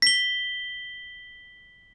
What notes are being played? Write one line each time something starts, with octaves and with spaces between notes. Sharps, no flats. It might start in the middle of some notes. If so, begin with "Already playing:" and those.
B6 G7